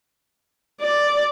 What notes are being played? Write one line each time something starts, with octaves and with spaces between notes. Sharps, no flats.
D5